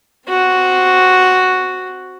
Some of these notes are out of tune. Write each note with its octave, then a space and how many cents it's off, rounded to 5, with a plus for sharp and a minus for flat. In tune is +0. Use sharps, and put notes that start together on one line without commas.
C4 +0 F#4 +0